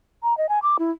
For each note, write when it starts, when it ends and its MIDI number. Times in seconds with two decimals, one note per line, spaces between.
0.23 0.36 82
0.38 0.49 75
0.49 0.59 80
0.62 0.77 86
0.79 0.91 64